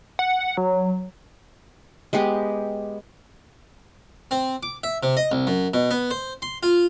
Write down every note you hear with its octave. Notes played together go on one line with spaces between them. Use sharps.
F#5
F#3
G#3 B3 G4
C4
D6
E5
C3
D#5
C2
F#2
B2
B3
C5
C6
F4